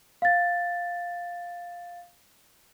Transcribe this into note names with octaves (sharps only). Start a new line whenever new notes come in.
F5 A6